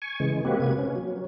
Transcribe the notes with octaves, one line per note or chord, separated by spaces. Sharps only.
G#5 C#6
C#3 E3 G#3
G#3 A#3 C4 F#4 G4 B4
C3 A#3 B4 G#6
C#4
F#3